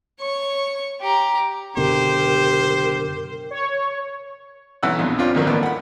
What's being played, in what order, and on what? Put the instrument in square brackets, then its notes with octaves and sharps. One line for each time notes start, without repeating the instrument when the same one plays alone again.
[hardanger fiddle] C#5 C#6
G4 A#5
[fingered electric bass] F#1 B2 D3 [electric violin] G4 [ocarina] A#4 [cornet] C5
[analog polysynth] C#5
[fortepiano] B1 E3 C#4 F#5 E6 F#6
A#1 F2 B2
G2 C4 C#4 F4
D#2 D3 F3 F#3 A#3
A1 D#2 A2 A#3 B3 D5
F#5 B5